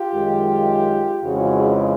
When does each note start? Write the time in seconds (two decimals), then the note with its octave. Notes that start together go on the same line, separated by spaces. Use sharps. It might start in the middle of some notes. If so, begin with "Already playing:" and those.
Already playing: F4 G4
0.13 F#2 D#3 G#3
1.24 F2 C#3 E3 G#3 F#4 G#4